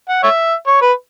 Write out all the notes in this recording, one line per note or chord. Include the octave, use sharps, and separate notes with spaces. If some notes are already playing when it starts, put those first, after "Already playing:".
F#5
C#5 E5
C#5
B4